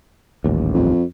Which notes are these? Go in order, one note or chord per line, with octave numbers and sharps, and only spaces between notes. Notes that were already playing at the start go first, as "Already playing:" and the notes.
D#1 A1 D#2
F2